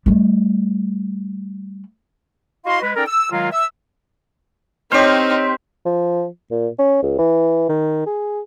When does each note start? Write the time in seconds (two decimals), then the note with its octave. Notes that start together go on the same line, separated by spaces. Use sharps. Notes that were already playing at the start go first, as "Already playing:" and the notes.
0.06 G3 A3
2.66 E4 F#4 D#5 F5 C6
2.83 G#3 B4
2.96 C#4 D#4 A4 A#4 D5 G5
3.08 E6
3.32 D#3 F#3 G#3 F4 A#4 F5
3.52 E5 E6
4.92 C4 D#4 G4 C5 C#5 F6
5.85 F3
6.51 A#2
6.79 C#4
7.03 C#2
7.18 E3
7.69 D#3
8.06 G#4